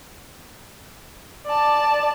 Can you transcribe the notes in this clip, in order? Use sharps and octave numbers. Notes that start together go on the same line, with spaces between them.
D5 A5